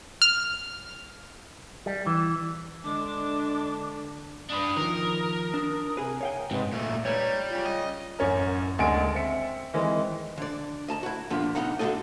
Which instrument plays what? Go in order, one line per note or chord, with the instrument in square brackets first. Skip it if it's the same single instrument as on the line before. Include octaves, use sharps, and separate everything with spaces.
[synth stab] F6
[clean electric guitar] G3
E3
[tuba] D3 [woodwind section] G#3 [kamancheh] D4 [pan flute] D6
[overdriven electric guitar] D4 B4 [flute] D#6
[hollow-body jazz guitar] D#3 F3 [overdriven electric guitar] A#4
[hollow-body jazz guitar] D4 [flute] D#6
[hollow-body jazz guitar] C3 G#4 B4 [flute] G#5
[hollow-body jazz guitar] C#5 F5 G5
[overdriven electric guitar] G#2 [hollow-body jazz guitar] C3 [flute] B4
[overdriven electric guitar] A#2 A3
[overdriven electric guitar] G3 [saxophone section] D#4 B4 C#5
[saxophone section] C#3 C#4 F4
[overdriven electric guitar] D#5
[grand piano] A1 F#2 C#4 A#4
F#1 D2 G#3 G#5 D7
C4 E5 C#7
D#3 E3 G#3 C4
[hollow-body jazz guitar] D3 D5
D#5 A5 A#5
E4 F#4
G2 A#2 D3 F3 B3 D4
C#3 B3 D#4 F#5 A#5
G2 D3 F#4 A4 D#5